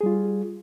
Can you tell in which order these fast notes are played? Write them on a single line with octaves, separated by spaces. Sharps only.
G#4 G3 F4